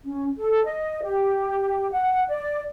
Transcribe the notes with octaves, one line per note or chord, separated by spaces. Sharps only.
C#4
A4
D#5
G4
F#5
D5